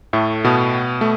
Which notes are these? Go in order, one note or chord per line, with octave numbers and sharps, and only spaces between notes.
A2 A3
B2 B3
A3